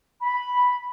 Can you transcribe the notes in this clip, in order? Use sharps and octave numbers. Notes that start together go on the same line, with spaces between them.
B5